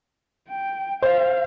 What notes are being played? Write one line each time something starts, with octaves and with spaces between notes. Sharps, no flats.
G5
C5 F5